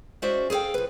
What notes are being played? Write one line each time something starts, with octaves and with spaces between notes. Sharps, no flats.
G#3 C#4 F#4 C5 D5 E5
G#4 A4 B4 F5 G5
F3 B4